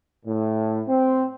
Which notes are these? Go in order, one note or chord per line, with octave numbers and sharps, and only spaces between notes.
A2
C4